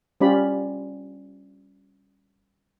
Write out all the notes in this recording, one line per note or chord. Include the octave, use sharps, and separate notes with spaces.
G3 C#4 F4 G4 D5 B5